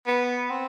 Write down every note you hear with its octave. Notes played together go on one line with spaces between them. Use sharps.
B3
C4